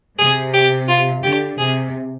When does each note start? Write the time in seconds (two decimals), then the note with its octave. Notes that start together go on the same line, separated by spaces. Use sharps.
0.18 C3 G#4
0.54 G4
0.88 F4
1.23 D3 G4
1.58 C3 G#4